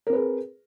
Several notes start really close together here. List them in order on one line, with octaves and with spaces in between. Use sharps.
A#4 C4 B4 G#4